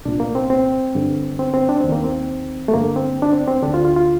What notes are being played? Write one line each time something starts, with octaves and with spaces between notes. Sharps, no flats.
C2 A#2 D4
A#3
C4
C4
G2 D3
C4
C4
D4
D#2 C4
D#3 A#3
C4
A3
G2 D3 A#3
C4
D4
C4
C4
D3 D4
D2
F4
F4
F4